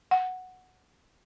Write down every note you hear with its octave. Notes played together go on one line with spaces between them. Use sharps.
F#5